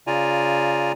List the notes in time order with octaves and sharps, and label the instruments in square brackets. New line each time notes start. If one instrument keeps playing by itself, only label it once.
[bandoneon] C#3 F4 D5 G#5 A#5